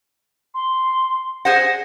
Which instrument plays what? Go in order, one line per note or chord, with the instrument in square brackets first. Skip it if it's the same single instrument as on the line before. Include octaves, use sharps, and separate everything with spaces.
[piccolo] C6
[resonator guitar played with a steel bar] G#4 C5 F#5 [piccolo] A#6